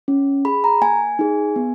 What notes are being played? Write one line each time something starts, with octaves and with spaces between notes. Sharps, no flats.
C#4
G#4 B5
A#5
A#3 G#5
D#4 G#4
B3